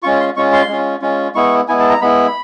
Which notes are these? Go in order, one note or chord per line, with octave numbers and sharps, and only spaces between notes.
G#3 C#4 F4 C#6
C6
G#3 C#4 F4 C#6
C6
G#3 C#4 F4
G#3 C#4 F4
G#3 B3 E4 C#6
G#3 B3 E4 G#5
A5
A#5
G#3 B3 E4 B5